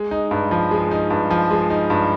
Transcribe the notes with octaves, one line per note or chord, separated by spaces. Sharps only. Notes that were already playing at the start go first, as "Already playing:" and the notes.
Already playing: G#3
D#4
G2
F3
G#3
D#4
G2
F3
G#3
D#4
G2